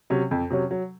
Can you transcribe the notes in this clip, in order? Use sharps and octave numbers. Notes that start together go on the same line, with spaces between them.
C3 F#3 C#4
F2
C3 F#3 C#4
F#3